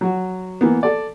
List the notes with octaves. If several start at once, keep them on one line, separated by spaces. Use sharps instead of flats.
F#3 F#4
E3 A#3 B3
A4 D5